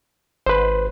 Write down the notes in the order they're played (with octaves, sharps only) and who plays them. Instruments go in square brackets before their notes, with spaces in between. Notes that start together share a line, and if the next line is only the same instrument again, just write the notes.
[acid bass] G#1 [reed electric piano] B4 C5